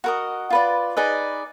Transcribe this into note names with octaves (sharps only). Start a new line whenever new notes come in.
F#4 A#4 D#5 F#5
F4 B4 D5
D#4 G#4 B4 D5 D#5